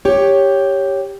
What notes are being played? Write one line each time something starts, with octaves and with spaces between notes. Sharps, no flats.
G4 C#5